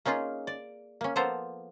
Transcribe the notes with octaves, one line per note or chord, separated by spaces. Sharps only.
A#3 C#4 D#4 F4 G#4
D5
A#3 C#4
F3 A#3 B3 A4 C5 A#5